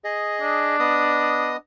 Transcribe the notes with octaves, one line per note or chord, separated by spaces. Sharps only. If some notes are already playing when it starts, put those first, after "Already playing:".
G#4 D#5
D4
B3 D#5 D#6